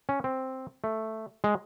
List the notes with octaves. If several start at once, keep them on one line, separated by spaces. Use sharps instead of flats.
C#4
C4
A3
G#3